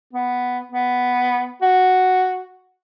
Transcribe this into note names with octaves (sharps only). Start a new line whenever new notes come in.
B3
B3
F#4